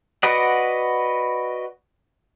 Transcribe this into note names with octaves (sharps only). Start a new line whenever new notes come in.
F#4 B4 D5 D#5 F#5